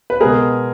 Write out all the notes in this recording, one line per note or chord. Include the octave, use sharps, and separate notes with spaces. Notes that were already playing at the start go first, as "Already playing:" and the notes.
B4
B2 G#3 B3 G#4 A#4